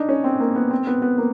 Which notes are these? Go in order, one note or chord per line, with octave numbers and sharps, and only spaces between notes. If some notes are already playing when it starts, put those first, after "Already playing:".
Already playing: D4 D#4
C#4
C4
A#3
B3
C4
B3
B3
A#3